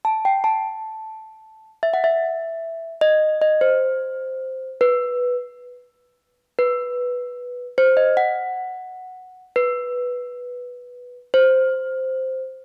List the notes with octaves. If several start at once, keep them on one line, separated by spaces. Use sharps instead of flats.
A5
G5
A5
E5
F#5
E5
D#5
D#5
C5
B4
B4
C5
D#5
F#5
B4
C5